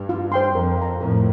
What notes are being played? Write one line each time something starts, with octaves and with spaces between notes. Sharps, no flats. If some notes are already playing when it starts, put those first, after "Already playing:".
Already playing: G2
F4
C5 G5 C6
F2 A#4
F5 A#5
F2 A2 A#4